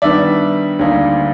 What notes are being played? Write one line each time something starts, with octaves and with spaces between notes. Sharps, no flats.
G2 D#3 G3 B3 D4 D5 E5
D2 D3 G3 A#3 D#4